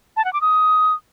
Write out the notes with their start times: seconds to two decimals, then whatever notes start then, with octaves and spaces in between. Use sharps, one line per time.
0.17 A5
0.25 F#5
0.33 D6
0.41 D#6